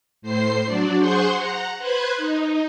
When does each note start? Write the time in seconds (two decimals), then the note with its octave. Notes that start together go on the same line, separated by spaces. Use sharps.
0.22 A2 C5 C7
0.65 F#3 D4 D5
0.98 G#4 C5 F#5 C6 C#6 G6
1.36 F#5 A#5
1.79 B4 C5 F#6 G#6
2.17 D#4